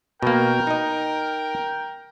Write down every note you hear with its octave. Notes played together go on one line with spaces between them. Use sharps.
B2 A#3 A#4 G5
D#4 D#5